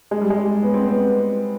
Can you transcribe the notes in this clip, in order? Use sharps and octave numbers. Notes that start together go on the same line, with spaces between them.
G#3
G3
G#3
B3
C4
B3